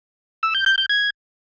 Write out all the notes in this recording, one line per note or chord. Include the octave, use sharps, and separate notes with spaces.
E6
G6
G6
G6
G#6